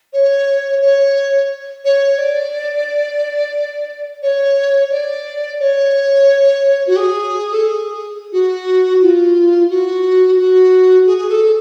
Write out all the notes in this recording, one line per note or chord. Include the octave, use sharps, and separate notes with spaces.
C#5
C#5
C#5
D5
C#5
D5
C#5
F#4
G#4
A4
G#4
F#4
F4
F#4
F#4
G#4
G#4
A4